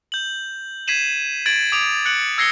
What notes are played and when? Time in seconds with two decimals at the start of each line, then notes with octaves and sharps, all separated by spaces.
0.12 G6 F#7
0.87 G#6 B6 C7 D#7 E7 F#7
1.46 G#6 A6 D7 E7 F#7
1.72 D6 D#6 D7 F7
2.06 F#6 C#7 D7 F#7
2.38 E6 G#6 A#6 C7 C#7 G7